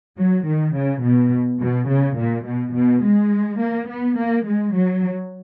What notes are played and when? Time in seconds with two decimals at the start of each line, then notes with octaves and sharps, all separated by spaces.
0.18 F#3
0.47 D#3
0.76 C#3
1.03 B2
1.61 B2
1.89 C#3
2.18 A#2
2.46 B2
2.75 B2
3.04 G#3
3.61 A#3
3.89 B3
4.17 A#3
4.46 G#3
4.75 F#3